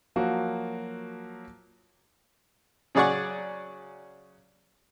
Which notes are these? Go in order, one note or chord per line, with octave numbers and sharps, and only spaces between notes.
F3 F#3 A#3 F#4
C#3 F#3 G#4 D5 F#5 C#6